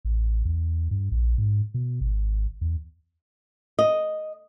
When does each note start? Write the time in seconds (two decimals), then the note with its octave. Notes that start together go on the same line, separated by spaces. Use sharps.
0.05 A1
0.45 E2
0.91 G2
1.12 A#1
1.38 G#2
1.74 B2
2.01 G#1
2.61 E2
3.79 D#5